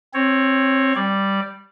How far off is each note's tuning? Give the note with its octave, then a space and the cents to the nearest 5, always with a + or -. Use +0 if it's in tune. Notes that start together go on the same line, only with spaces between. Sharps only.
C4 +20 C#5 +0
G3 +0 D5 +0